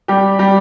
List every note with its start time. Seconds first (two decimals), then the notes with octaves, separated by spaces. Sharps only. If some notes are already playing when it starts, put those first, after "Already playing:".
0.08 G3 G4
0.39 G3 G4